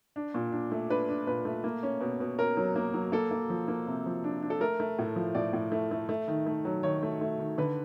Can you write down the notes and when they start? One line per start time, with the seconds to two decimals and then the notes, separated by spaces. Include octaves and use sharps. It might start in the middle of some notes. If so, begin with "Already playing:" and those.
0.16 D4
0.34 A#2
0.52 D4
0.71 A3
0.90 D4 B4
1.09 D4
1.27 A#2 B4
1.45 A3
1.64 A#3
1.83 C#4
2.01 B2
2.20 B2
2.39 C#4 A#4
2.57 F#3
2.76 A#3
2.94 F#3
3.12 A#3 A4
3.31 A#3
3.50 F3
3.68 A#3
3.87 C3
4.06 F3
4.24 D4
4.42 D4
4.50 A4
4.60 A3 A#4
4.80 A3
4.99 A2
5.16 F3
5.35 A2 D5
5.53 A2
5.72 A3
5.91 A3
6.09 A3
6.28 D#3
6.46 A3
6.65 F#3
6.83 D#3 C#5
7.03 A3
7.21 A3
7.39 D#3
7.58 D3 B4